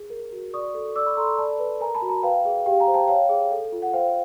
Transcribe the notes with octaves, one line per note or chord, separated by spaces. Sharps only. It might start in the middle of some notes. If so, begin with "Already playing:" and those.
Already playing: G#4
A#4
F#4
D5 C#6 D#6
A4
D5 D6 E6
B5 C#6
A4 A#5 C6
B5 C#6
D5 A5 B5
B4
A#4 G#5 A#5
A5 B5
F#4
G#5 A#5
B4 F5 G5
G#4
G4 F5 G5
G#5 A#5
C5
G5 A5
C#5 F5 G5
G#4
A4
F4
F#5
C5 F5 G5